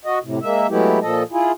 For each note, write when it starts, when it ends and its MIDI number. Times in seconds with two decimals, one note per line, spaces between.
0.05 0.19 66
0.05 0.19 75
0.23 0.39 45
0.23 0.39 48
0.42 0.67 56
0.42 0.67 58
0.42 0.67 76
0.69 0.99 54
0.69 0.99 56
0.69 0.99 57
0.69 0.99 59
0.69 0.99 64
0.69 0.99 67
1.01 1.23 46
1.01 1.23 53
1.01 1.23 69
1.01 1.23 75
1.32 1.52 64
1.32 1.52 65
1.32 1.52 68